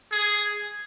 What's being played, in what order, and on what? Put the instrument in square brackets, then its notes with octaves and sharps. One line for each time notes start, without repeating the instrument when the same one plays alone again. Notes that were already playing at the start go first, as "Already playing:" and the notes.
[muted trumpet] G#4